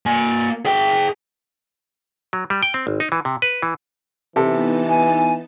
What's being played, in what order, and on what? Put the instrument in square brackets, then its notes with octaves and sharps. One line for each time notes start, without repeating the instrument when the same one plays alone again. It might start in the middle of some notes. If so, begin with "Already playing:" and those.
[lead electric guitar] A#3 G#5
G#4 G5
[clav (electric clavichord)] F#3
G3
G5
C4
G#1
D#4
E3
C3
B4
E3
[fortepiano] C3 A4 [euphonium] E3 [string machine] B3 D#4 A5
[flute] G#5